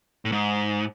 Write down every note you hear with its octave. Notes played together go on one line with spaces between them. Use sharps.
A2
G#2